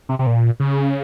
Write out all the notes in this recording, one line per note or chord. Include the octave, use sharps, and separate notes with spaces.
C3
C3
A#2
C#3